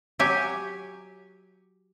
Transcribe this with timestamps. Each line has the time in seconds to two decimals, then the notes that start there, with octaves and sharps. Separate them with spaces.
0.19 F#3 G4 G#5